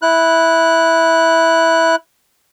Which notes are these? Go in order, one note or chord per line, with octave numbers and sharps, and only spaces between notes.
E4 F#6